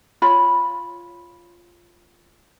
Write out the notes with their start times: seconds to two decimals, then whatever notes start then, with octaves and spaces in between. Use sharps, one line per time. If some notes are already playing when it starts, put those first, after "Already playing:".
0.22 F4 C#5 B5